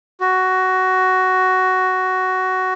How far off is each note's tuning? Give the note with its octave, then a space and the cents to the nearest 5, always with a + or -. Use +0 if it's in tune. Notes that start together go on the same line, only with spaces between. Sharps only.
F#4 +10